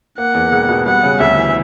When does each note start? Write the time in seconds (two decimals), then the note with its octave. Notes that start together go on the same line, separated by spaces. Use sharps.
0.18 A#3 F#5
0.34 E2
0.52 E1
0.69 B2
0.86 G3 F#5
1.03 C#3
1.20 D2 E5
1.38 E3